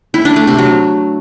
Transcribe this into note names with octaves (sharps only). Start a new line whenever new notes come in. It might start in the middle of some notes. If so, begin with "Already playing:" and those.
E4
D4
A3
C3
F#3